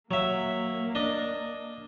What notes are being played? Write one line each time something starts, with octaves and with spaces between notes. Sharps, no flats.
F#3 A#3 E5
D4 D#5